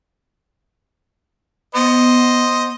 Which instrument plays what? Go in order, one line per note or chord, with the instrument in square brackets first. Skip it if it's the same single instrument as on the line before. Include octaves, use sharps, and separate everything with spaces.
[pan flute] B3 [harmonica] C5 D#5